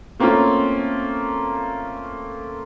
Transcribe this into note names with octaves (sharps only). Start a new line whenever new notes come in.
A3 A#3 C4 C#4 F4